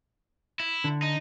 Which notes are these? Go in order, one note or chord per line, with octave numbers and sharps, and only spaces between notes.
E4
D3
D#4